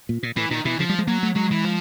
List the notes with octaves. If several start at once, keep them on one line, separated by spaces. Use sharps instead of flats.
A#2
A#2
A2 E3
A#2 D#3
B2 E3
C#3 F3
G3
G#3
F#3 A#3
A3
F#3 G#3
E3
F3